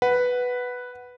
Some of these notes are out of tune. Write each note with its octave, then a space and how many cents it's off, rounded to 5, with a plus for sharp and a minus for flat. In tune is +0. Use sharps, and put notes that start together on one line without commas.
B4 +0 F#5 +0